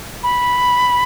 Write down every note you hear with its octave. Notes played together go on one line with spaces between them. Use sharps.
B5